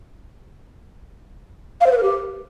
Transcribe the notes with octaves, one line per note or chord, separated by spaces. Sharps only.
F5
C5
B4
A#4
G4